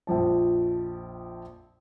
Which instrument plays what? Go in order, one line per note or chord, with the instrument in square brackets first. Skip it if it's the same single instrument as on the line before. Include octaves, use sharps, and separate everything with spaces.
[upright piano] A#1 F2 F3 A5